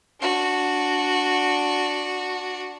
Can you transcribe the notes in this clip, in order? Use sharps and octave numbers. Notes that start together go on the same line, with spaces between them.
D4 F#4